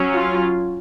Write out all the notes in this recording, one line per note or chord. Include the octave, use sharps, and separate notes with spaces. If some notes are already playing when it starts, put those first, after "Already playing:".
Already playing: F#3 C#4
F4